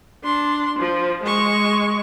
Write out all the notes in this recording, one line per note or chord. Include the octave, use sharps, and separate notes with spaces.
D4 C6
F3
G#3 C#6